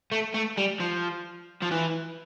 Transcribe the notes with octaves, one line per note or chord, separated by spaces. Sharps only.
A3
A3
G3
F3
F3
E3